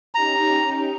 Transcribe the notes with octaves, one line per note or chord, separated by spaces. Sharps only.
C#4 D#4 G4 A#5